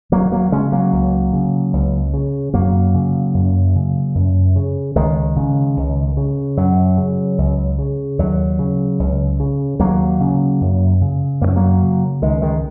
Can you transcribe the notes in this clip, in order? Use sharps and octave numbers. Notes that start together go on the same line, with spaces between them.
D#2 F#3 A#3
F#3 A#3
C#3 G#3 C#4
F#3 A#3
C#2
C#3
C#2
C#3
F#2 F#3 A#3
C#3
F#2
C#3
F#2
C#3
C#2 D#3 G#3
C#3
C#2
C#3
F#2 F#3
C#3
C#2
C#3
D#2 F#3
C#3
C#2
C#3
D#2 F#3 A#3
C#3
F#2
C#3
F#2 A#3
C#4
F#3 A#3
C#3
C#2 D#3 G#3
D#3 G#3